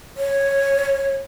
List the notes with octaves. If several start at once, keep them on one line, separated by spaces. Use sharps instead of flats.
C#5